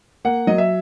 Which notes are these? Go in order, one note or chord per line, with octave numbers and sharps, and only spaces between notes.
A#3 F#5
F#3 D#5
E5